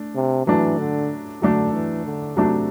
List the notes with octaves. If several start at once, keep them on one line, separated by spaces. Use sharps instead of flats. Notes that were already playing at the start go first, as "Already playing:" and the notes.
Already playing: A3 D4
C3
E3 F#3 A3 D4
D3
D3 F#3 A3 D4
E3
D3
C3 F#3 A3 D4